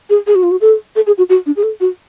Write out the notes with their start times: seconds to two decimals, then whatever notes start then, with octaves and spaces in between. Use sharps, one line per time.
0.10 G#4
0.27 G#4
0.35 F#4
0.43 F4
0.51 F#4
0.61 A4
0.96 A4
1.07 G#4
1.18 F#4
1.29 F#4
1.46 D4
1.57 G#4
1.63 A4
1.81 F#4